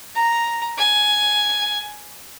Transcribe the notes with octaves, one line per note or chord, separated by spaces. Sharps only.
A#5
G#5